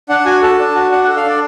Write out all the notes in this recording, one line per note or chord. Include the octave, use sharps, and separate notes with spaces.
D4 F#5
F#4 G#5
A4 A5
D4
F#4
D4 F#5
A4 F#5
F5
D4 D5